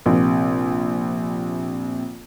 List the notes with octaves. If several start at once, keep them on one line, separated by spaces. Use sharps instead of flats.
A#1 C3